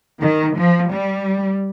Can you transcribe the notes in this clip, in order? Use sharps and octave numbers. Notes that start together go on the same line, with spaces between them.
D#3
F3
G3